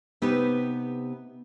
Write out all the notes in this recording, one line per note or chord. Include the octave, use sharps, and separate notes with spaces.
C3 B3 D#4 G4 B4